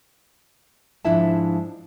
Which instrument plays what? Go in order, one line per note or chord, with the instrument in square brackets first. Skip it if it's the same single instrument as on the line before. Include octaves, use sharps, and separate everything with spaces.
[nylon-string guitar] G#2 F3 D4 E4 E5 A5